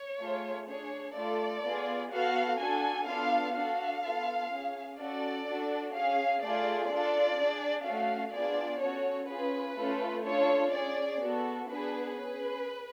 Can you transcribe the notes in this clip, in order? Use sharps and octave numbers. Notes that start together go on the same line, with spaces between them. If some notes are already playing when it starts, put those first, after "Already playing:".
Already playing: C#5
A3 F4 G#4
D4 G#4 C#5
A3 F4 A4 D5
B3 F4 G#4
B3 F#4 A4 F5
D4 F#4 A4 G#5
B3 D4 F4 A4 F5
D4 F#4 A4 F5
B3 F4 A4
C#4 G#4
C#4 F#4 A4 D5
D4 F#4 A4
C#4 G#4 F5
A3 F4 G#4 D5
D4 F4 A4 D5
D4 G#4
A3 C#4 F#4 A4 F5
B3 D4 F4 G#4 D5
C#4 F#4 A4 C#5
C#4 F4 G#4 B4
A3 C#4 F4 A4
D4 F4 A4 C#5
C#4 G#4 D5
B3 F#4 A4
B3 D4 G#4 B4
C#4 G#4 B4